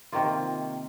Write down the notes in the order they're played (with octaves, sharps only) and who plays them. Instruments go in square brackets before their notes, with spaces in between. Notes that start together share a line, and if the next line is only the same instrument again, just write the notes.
[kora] C3 D#3 A#3 F4